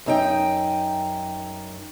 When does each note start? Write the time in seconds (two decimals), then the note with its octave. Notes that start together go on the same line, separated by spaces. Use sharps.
0.06 F#2 D#4 G5